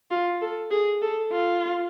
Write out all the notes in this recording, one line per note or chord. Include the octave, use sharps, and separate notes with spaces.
F4
A4
G#4
A4
F4